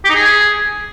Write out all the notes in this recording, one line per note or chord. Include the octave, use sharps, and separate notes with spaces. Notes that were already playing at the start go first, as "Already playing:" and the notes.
G4
D#4
G#4